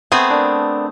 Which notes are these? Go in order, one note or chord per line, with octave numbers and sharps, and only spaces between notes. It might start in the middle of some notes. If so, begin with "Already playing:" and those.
A3 B3 C4 G#4
D4 A#4 D5